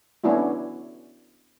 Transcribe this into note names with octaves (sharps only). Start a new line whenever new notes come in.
B3 C#4 D4 E4 F#4